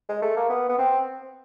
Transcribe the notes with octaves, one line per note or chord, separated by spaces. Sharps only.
G#3
A3
A#3
B3
B3
C4